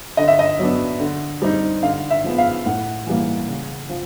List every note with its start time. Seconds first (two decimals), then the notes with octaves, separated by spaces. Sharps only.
0.17 D3 D#5
0.28 E5
0.39 D#5
0.59 F#3 B3 D4
1.00 D3
1.42 G3 C4 D#4
1.83 D3 F5
2.10 E5
2.24 F3 G#3 B3
2.38 F5
2.66 A2 F#5
3.07 E3 G3 A#3
3.48 C#3
3.89 F3